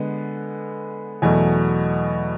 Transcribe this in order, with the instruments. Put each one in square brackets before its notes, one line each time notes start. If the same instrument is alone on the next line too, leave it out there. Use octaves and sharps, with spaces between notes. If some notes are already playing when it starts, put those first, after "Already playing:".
Already playing: [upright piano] D3 G#3 B3
E2 B2 F#3 A3 G#5